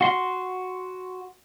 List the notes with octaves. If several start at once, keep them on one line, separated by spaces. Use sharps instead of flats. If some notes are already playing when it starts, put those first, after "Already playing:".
F#4 C6